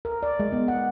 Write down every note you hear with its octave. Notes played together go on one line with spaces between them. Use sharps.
A#4
D5
G#3
B3
F#5